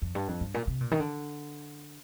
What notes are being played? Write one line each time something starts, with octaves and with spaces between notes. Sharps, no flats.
F2
G2
F2
G2
A#2
C3
A#2
D#3
D3